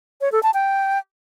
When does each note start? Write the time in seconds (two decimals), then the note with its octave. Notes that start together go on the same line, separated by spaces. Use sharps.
0.21 C#5
0.32 A4
0.43 A5
0.54 G5